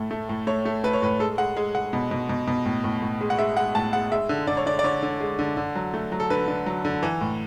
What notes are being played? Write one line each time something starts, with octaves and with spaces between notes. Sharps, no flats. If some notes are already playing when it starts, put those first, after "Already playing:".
Already playing: A2 A3
A3
A2
A3 C#5
A3
A3 B4
C#5
A2 B4
G#3 A4
G#3 F#5
G#3
G#3 F#5
B2
B2
B2
B2
A2
A2
A2
G#3
F#5
G#3 E5
G#3 F#5
A2 A5
G#3 F#5
G#3 E5
D3
D3 D5
C#5
D3 D5
D5
D3 C#5
D3
G#3
D3
D3
F#3
A3
F#3
A4
D3 B4
D3
F#3
D3
E3
A2